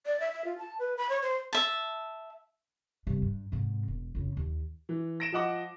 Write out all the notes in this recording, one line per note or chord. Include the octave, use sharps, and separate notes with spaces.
D5
E5
E5
F4
A5
B4
B5
C#5
C5
E5 A5
G2 C3
G2
G#2 C3
E1
F2 C#3
D#2
E3
A#6 D7 E7
F3 D#5 F#5 D6